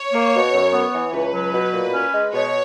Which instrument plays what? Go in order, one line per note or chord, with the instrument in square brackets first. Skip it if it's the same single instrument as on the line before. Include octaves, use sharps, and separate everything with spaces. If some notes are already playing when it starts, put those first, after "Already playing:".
Already playing: [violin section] C#5
[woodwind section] A#3
B2
F#2
B3
E3
[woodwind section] C#2 [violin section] B4
[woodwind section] F#3
B2
A#2
C#4
G#3
[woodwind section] B2 [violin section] C#5